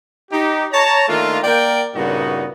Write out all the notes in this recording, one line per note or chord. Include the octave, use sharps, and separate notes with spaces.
D#4 G4
C#5 A5 A#5
D#3 A3 A#3 D4 F4
A#3 A#4 D5 G5
G2 A#2 C#3 B3 D#4 F#4